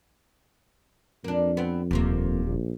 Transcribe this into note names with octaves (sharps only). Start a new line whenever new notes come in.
F2 A#3 D4
B3 C4
D#1 D2 C3 A#3
A#1